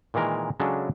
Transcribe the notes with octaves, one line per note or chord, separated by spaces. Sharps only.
A#2 D#3 E3 G#3 A#4
C#3 F#3 G#3 C#4 D4 A4